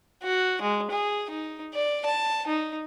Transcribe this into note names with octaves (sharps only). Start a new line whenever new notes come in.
F#4
G#3
G#4
D#4
D5
A5
D#4